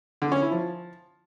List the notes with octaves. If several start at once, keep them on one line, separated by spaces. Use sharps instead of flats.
D3
C#4
E4
F3